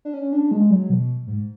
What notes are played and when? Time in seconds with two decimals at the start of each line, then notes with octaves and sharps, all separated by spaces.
0.05 D4
0.14 C#4
0.33 D4
0.51 G#3
0.70 F#3
0.90 B2
1.27 G#2